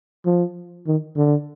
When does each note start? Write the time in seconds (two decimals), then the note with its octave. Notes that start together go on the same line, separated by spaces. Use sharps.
0.26 F3
0.87 D#3
1.17 D3